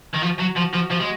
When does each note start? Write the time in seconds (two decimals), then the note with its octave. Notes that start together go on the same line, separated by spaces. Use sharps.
0.14 D#3
0.22 F3 F#4
0.39 F#3
0.56 F3
0.73 F3
0.91 F3
1.00 G#3